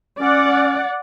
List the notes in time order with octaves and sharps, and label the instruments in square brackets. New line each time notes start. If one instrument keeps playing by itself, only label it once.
[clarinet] C#4 [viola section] D5 F#5